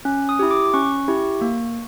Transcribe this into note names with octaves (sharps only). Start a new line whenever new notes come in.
C#4
D#6
E4 G4
D6
C#4 C#6
E4 G4
A#3